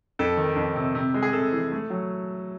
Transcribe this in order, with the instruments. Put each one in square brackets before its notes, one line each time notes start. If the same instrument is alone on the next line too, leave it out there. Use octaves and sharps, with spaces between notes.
[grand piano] F2 A4
D#3
F2
C3
C3
G#3
G#4
C3 A4
E3
A3
F#3